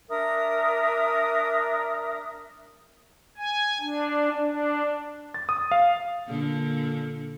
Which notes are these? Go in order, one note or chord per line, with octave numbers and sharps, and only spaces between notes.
D4 A#4 E5 D#6
G#5
D4
D4
A6
D#6
F5
A#2 D3